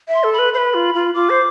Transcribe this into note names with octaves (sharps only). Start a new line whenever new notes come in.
E5
C6
A4
B5
B4
B4 C5 B5
F4
F4
F4 D6
C5